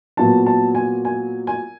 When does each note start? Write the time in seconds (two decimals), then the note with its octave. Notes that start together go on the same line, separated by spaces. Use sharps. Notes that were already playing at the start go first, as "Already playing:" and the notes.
0.17 A#2 F#3 B3 A5
0.46 A5
0.75 G#5
1.05 G#5
1.47 G#5